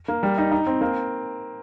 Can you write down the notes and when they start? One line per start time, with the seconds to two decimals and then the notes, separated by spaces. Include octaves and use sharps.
0.08 A#3
0.23 G3
0.38 D#4
0.52 D#4
0.67 C4
0.81 A#3